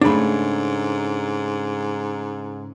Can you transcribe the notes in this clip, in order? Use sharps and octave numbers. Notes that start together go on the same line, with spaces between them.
G#2 C#3 A3 D4 B5